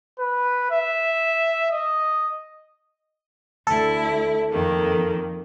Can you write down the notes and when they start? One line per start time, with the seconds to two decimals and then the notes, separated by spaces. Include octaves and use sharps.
0.19 B4
0.71 E5
1.71 D#5
3.67 D2 E4 A4
4.50 F2 D#3 A#3